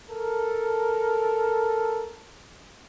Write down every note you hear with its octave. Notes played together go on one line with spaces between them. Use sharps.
A4 A#4